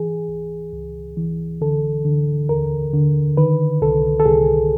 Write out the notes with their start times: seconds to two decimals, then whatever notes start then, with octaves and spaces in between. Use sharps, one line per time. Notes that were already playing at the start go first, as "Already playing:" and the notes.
Already playing: E3 G#4
0.28 C#2
0.73 C#2
1.17 E3
1.61 D3 A4
2.05 D3
2.49 D#2 A#4
2.93 D3
3.37 D#3 B4
3.81 C2 A4
4.20 A4
4.26 C2 G#4